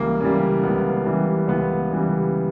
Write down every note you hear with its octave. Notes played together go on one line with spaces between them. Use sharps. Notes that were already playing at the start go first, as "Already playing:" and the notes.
Already playing: C#2 E3 G3 A#3
C#3 E3 G3
C#2 B3
C#3 E3 G3
C#2 B3
C#3 E3 G3